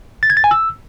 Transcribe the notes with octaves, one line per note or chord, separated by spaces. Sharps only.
A6
G#6
A6
G#5
E6